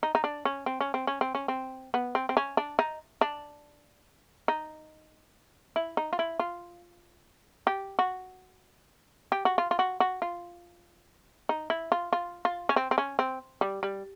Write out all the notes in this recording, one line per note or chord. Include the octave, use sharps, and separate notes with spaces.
D#4
D#4
D4
C#4
C4
C#4
C4
C#4
C4
C#4
C4
B3
C4
C4
C#4
D4
D#4
D4
D#4
E4
D#4
F4
E4
F4
G4
F#4
G4
F#4
F4
F4
F#4
F#4
F4
D#4
E4
F4
F4
F4
C#4
C4
C4
C#4
C4
G3
G3